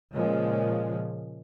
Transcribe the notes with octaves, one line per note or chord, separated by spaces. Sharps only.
A#2 C#3 F3 G#3